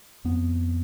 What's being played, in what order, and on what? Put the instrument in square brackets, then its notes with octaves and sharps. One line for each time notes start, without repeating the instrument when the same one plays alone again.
[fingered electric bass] F2 B3